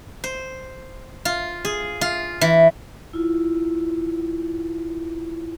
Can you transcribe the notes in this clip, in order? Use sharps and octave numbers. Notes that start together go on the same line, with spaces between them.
C5
F4
G#4
F4
E3
E4 F4